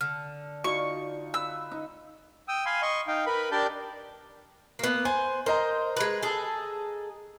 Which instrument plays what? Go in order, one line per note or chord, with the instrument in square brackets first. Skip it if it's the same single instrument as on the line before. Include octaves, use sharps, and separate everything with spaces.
[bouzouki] D3 [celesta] F6
[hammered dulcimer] D#4 F4 [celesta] F#4 D5 [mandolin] C#6
[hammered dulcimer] B4 [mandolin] E6
[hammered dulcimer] D#4
[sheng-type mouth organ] G5 D#6 E6
F5 G#5 B5 C6
D#5 C6 C#6
D#4 F5 G5
A#4 B4 B5
D4 G4 A#4 D5 A5 G6
[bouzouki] A#3 B3
[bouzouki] C5 [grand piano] G#5
[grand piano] A#4 D#5 A#5 [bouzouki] C5
[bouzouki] G#3 B4
G#4 A4